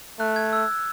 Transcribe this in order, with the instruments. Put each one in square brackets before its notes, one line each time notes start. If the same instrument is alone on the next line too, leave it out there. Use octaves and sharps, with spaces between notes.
[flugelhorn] A3 [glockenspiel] F#6
[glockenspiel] G#6
E6